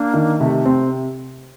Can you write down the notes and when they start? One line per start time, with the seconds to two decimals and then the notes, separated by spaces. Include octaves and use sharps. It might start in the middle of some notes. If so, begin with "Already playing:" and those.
Already playing: A#3 D4
0.14 D#3
0.40 C3 A3
0.66 C4